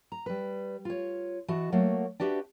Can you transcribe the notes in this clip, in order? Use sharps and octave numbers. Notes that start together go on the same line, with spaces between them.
A#5
G3 B4
F4 C#5
E3 F#4 D#5 A5
F#3 A3 A#3 F#4
D4 F#4 G4 B4 E5